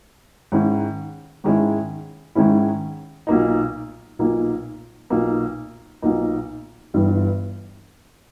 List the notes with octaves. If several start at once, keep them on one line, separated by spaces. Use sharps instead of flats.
G#2 D#3 G#3 C#4 E4
G#2 D#3 G#3 C#4 E4
G#2 D#3 G#3 C#4 E4
B1 A#2 A#3 D#4
B1 A#2 A#3 D#4
B1 A#2 A#3 D#4
B1 A#2 A#3 D#4
G1 G2 E3 G3